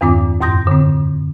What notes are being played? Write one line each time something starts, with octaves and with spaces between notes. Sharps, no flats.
E2 G2 D#3 C4 F4 D6
F#2 A2 C6 D#6 G6 A#6
D3 C4